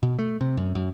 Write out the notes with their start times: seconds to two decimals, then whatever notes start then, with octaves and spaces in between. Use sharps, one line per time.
0.03 B2
0.19 A3
0.41 C3
0.57 F#2
0.75 F#2